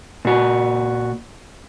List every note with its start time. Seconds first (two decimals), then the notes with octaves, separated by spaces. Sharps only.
0.25 A#2 F#4